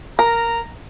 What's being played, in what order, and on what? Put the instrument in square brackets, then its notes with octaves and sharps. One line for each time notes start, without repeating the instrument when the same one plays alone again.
[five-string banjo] A#4 [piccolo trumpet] A#5